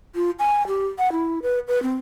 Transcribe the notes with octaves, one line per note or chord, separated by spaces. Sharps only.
F4
G#5
G4
F#5
E4
B4
B4
C4